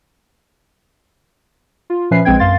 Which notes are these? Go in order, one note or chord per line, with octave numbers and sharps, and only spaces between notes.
F4
A#2 F3 C#4 B4 E5 C7
A#1 G#3 C4 B4 G5 G#6
F#2 F5 C6 A6